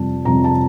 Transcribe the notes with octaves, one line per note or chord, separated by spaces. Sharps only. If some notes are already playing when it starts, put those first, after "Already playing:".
Already playing: F2 C3 G3 A5
F2 C3 G3 A#5
A5